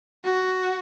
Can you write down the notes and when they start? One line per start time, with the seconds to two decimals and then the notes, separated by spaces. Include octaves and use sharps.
0.24 F#4